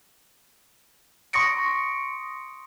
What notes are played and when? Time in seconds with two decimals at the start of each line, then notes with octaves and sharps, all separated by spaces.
1.33 C6 C#6 D#6 A#6 C#7 D7